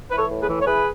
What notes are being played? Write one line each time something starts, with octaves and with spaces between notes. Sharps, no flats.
E3 B4
A4 C#5
A2
G#4 B4
E3
C#5
E3 G#4 B4